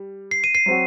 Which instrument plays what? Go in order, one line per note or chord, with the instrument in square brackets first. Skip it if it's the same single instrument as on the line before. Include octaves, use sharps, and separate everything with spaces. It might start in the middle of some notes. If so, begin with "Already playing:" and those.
Already playing: [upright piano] G3
[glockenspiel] C7
D#7
C7
[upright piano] F#3 C4 F#4